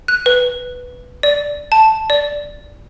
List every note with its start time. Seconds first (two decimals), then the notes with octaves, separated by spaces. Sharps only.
0.08 F#6
0.26 B4
1.23 D5
1.72 A5
2.10 D5